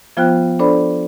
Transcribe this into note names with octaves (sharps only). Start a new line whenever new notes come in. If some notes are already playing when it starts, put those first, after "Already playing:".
F3 B3 F4 C5 G5 F#6
D4 A4 C5 D5 B5